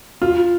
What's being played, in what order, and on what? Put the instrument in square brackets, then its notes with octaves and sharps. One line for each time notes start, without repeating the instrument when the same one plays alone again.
[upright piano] F4